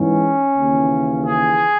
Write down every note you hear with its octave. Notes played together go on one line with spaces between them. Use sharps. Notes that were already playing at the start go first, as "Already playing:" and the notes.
Already playing: G#2 E3 C#4
D#2 C#3 E3
G#4